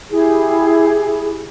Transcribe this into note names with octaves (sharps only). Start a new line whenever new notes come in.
E4 G4 G#4